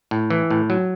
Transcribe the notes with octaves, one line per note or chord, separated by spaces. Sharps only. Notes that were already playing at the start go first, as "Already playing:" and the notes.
A2
E3
A2
F#3